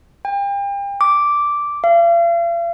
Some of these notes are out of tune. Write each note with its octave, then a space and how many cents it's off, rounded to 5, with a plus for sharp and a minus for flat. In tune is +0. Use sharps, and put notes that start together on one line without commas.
G5 +35
D6 -5
F5 -45